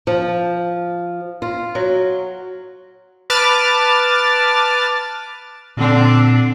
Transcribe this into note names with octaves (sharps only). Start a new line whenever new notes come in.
F3
F4
F#3
B4 A5 D6 F6 A6
A#2 D3 C4 D4